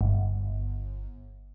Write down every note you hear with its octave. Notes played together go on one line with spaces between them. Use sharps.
G1